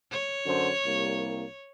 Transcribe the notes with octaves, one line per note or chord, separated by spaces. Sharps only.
C#5
F#2 D3 C5
C2 G3 A#3